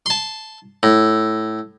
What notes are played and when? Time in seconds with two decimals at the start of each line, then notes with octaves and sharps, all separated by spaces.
0.06 A5 C6
0.83 A2